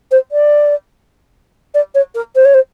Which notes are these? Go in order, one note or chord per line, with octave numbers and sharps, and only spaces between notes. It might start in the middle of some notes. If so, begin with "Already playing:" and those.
C5
D5
D5
C#5
A#4
C5
C#5
C5